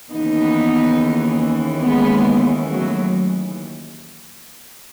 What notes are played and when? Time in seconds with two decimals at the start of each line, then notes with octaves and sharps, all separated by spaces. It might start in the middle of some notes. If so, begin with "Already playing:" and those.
0.12 D#2 C#3 E3 B3 D#4
1.82 G#3 B3
2.68 F#3 A3